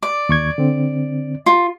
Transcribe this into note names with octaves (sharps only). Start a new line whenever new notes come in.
D5
D#2 C#6 G#6
D3 C4
F4